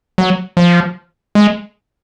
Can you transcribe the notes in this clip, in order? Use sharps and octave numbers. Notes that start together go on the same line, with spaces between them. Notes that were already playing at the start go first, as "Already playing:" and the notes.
F#3
F3
G#3